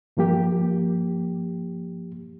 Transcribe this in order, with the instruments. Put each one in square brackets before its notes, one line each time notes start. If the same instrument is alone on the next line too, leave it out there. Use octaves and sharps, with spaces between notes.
[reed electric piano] G2 F3 A#3 G4